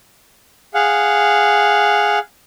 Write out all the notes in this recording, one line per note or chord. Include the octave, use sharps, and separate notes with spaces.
G#4 F5 F#5